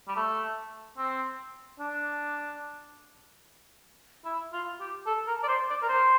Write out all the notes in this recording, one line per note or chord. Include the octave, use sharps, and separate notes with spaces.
G3
A3
C4
D4
E4
F4
G4
A4
A#4
D5
C5
D5
A#4
C5